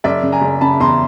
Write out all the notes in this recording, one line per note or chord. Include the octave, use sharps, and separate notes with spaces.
F#1 D5 E5
C#3
G#5 A#5
F#1
C#3 A5 B5
E2 A#5 C6